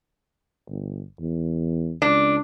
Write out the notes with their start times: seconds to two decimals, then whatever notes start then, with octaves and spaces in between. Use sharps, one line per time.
0.69 G1
1.20 E2
2.02 C#2 D4